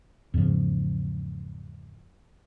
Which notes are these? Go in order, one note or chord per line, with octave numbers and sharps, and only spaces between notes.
E2 G#2 C#3 F3